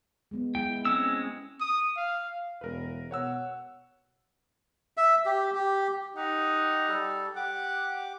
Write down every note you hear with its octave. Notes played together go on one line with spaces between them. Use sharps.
G#3 B3
G#3 E4 G5
G#3 C4 C#4 E6
D#6
F5
E1 A#4 B4
B2 C#5 F#5 E6
E5
G4
G4
D#4 G4 F#5
G3 A4
G4 F#5 D6